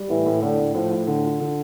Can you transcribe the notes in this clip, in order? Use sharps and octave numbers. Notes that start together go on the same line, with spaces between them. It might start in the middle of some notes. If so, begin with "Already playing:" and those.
Already playing: G3
A2 E3
A2
A2 D3
A2
A2 F3
A2
D3
F4
D3